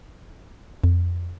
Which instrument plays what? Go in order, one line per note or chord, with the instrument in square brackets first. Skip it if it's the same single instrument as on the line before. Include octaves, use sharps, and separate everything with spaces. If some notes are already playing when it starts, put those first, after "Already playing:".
[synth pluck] F2